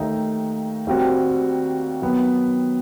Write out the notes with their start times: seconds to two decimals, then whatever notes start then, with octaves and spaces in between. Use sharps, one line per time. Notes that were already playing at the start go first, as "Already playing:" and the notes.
Already playing: D#2 D#3 A3 D#4
0.87 D#2 D#3 G3 C4 F#4
2.02 D#3 F#3 B3